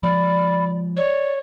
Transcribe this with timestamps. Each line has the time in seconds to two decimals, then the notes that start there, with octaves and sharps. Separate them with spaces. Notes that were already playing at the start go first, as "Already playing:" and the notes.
0.03 F3 G#3 D5 B5
0.97 C#5 D5